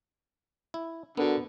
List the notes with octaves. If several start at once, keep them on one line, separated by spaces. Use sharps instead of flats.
E4
D3 B3 F#4 A4 A#4